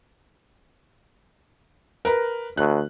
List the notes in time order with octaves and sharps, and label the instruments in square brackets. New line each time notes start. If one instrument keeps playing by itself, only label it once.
[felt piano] A#4 B4 A#5
[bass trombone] D2 [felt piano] F#6